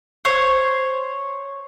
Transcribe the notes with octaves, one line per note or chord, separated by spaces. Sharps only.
C5 C#5